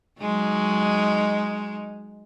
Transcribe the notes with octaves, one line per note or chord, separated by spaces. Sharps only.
F#3 G#3 D#4